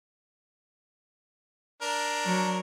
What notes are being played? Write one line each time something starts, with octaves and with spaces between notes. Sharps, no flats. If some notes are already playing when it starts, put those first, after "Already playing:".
D4 A#4
F#3